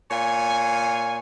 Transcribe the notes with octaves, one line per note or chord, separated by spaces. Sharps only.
A#2 C#5 F5 G#5